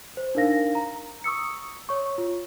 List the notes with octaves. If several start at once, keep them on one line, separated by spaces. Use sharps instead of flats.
C5
D4 D#4 A#4 F5 A#6
A#5
C#6 D#6 E6 C#7
C#5 C#6
F4